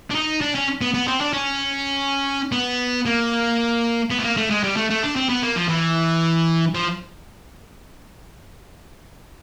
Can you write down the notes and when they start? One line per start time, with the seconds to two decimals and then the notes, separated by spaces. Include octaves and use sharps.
0.11 D4
0.15 D#4
0.41 D4
0.55 C#4
0.81 B3
0.94 B3
1.07 C4
1.21 D4
1.33 C#4
2.52 B3
3.06 A#3
4.11 B3
4.19 A3
4.24 A#3
4.37 A3
4.50 G#3
4.63 G3
4.76 A3
4.90 A3
5.03 D4
5.16 C4
5.29 B3
5.43 A#3
5.55 F3
5.68 E3
6.75 F3